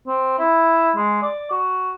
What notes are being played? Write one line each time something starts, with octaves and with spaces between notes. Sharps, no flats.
C4
E4
G#3
D5
F#4